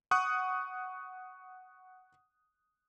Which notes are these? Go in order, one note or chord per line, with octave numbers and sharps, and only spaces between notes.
F#5 C#6 D#6 F#6